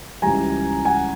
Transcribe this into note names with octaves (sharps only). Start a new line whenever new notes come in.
C#2 C#3 E3 G3 G#5 A#5
F#5 G#5